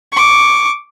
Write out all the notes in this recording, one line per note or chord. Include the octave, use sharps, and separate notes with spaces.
C#6 D6